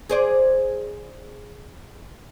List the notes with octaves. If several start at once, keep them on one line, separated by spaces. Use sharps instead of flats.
G#4 C5 D5